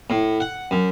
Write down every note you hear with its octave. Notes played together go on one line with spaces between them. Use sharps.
A2
F#5
F#2